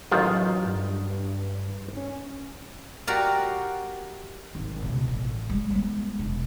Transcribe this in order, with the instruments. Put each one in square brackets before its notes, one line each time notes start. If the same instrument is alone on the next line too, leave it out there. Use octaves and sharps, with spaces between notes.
[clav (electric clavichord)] A1 D#3 F4 [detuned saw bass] F#3
[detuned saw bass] G2
C#4
[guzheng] F#4 G4 A#4 D5 F5
[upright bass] G#1
C#2 B2
A1
G3 G#3
G#3 B3
E1